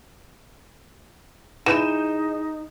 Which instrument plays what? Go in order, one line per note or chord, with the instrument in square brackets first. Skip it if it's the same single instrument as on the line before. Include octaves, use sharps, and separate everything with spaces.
[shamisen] E3 [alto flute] D#4 [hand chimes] G#4 [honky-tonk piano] G6 D#7 E7